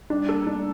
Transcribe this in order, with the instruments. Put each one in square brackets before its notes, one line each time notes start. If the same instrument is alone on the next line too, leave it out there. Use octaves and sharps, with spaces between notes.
[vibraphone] G3 [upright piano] D4
[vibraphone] A#3 [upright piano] A4
[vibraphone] A#3
[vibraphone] A3 [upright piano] D4